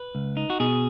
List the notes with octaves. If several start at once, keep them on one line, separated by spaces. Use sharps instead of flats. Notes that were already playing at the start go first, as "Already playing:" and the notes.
Already playing: B4
C#2
D#4
F#4
B2 G#4